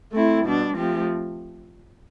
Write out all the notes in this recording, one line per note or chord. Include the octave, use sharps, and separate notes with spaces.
A3 C4 E4
B2 G3 D4
F3 A3 C4 G4